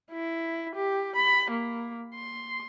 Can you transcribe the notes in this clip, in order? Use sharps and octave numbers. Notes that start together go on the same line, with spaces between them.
E4
G4
B5
A#3
C6